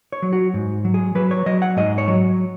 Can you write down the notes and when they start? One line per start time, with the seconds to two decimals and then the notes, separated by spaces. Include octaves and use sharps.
0.12 C#5
0.22 F#3
0.33 F#4
0.54 G#2
0.85 F#3
0.94 G#4
1.15 F#3 B4
1.31 C#5
1.46 F#3 D#5
1.62 F#5
1.77 G#2 D#5
1.98 C#5
2.08 F#3